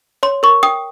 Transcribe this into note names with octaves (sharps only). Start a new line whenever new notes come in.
C#5 C6
A#4 C#6
G5 D#6